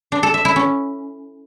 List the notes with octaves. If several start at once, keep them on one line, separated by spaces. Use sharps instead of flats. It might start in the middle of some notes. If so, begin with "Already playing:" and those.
D4
A4
E5
E4
C#4